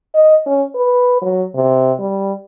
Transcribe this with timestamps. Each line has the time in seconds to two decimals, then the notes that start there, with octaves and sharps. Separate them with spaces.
0.15 D#5
0.46 C#4
0.75 B4
1.22 F#3
1.55 C3
1.99 G3